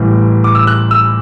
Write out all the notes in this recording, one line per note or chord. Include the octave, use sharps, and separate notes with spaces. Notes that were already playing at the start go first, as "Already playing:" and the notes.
Already playing: A1 A2 E3 G3 B3
D6
E6
F#6
E6